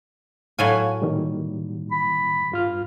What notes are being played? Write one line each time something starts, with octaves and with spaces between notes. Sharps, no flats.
A2 F#3 F5 G#5
A#2 D#3 G3
B5
G2 F4 F6